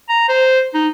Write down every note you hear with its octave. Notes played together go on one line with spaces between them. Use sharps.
A#5
C5
D#4